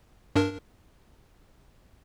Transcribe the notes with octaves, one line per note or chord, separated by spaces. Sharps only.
G2 D4 A#4